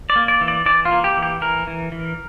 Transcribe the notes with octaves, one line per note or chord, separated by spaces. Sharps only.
D5
A#3
D5
E3
D5
E3 D5
F4
A#3
G4
E3
G4
E3 A#4
E3
E3